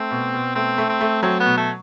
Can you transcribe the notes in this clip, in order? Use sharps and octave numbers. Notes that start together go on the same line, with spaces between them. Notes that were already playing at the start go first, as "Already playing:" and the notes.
Already playing: A3 C4
B2
B2
A3 C4
A3
C4
A3
F#3 C4
B3
B2
A3